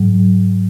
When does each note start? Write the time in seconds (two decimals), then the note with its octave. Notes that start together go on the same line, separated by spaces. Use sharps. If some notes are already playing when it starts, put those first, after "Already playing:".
Already playing: G#2 F#3